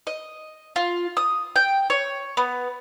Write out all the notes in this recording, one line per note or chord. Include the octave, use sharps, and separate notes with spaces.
D#5
F4
D#6
G5
C#5
B3